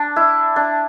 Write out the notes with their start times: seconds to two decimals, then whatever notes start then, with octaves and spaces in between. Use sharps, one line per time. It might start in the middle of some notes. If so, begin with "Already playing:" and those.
Already playing: D4
0.16 E4
0.56 D4